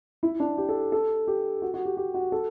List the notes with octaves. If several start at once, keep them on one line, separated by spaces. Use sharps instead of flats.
E4
D4
G4
A4
A4
G4
F#4
F#4
G4
G4
F#4
A4